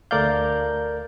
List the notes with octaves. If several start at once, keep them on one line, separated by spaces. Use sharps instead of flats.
D2 A3 A#4 D5 F5 G6